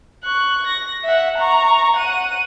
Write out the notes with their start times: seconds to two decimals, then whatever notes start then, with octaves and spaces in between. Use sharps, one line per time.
0.24 C#6 F#6
0.67 A#6
1.04 E5 F#5
1.38 A#5 C#6
1.96 F#5 D#7